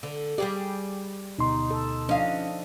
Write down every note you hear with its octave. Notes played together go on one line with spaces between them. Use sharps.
D3
G3 G4 G#4 D5
D2 B2 D#4 C6
A4
F3 C#4 D4 D#5 F5